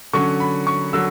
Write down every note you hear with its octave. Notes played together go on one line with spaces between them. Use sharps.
D3 F#3 C#4 C#6
B5
C#6
D3 F#3 E6